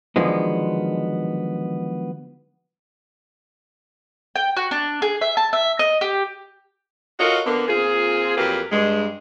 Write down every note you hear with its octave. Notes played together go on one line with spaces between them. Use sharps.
D3 D#3 F3 F#3 G#3 B3
G5
F#4
D4
G#4
E5
A5
E5
D#5
G4
F4 F#4 A4 A#4 C#5 D#5
D3 A#3 B3
A#2 C4 F4 G#4
F2 F#3 A#3 G4 B4
G2 G#3